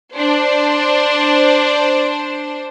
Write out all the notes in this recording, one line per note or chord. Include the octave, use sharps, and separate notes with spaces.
D4 C5